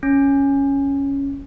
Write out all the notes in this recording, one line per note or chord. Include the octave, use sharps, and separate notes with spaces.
C#4